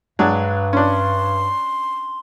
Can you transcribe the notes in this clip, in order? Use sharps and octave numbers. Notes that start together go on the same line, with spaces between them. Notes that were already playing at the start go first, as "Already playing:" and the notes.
G2 F#3 G#3 D4
C#4 D4 C6